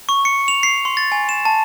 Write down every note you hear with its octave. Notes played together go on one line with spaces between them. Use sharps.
C#6
C#7
F7
C7
C6
A6
G#5
E7
A5